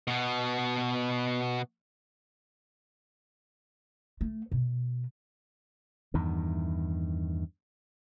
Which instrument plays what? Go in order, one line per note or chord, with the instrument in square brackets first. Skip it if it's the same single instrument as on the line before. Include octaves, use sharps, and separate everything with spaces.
[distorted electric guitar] B2 B3
[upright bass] A3
B2
[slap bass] E2 G2 D#3